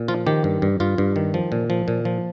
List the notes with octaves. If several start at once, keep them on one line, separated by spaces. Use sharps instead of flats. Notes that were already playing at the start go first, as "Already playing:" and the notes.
Already playing: A#2
F3 F4
D#3 G4
G2
G2
G2 F4
G2
D#3
F3
A#2
F3
A#2
F3